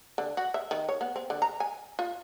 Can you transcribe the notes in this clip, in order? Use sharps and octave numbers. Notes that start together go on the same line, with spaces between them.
D3
F#4
E5
D#3
C#5
B3
C4
D3
A#5
G#5
F4